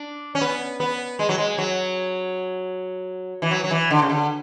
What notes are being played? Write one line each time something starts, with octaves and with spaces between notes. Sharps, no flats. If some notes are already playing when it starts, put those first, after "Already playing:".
Already playing: D4
C#4
B3
B3
G#3
F#3
G#3
F#3
E3
F#3
F#3
E3
D3
C#3
D3